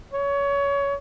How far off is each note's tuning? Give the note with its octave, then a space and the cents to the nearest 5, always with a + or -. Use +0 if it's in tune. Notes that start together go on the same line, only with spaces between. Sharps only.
C#5 +25